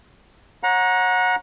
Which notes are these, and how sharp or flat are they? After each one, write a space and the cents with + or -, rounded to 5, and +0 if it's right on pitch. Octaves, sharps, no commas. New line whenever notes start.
C#5 -20 F#5 -20 A#5 +20